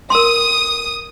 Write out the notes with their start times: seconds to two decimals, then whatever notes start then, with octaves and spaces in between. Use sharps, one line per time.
0.10 A#4 C6 D#6